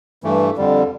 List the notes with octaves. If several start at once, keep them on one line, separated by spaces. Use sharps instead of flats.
G2 E3 A3
F2 D3 G3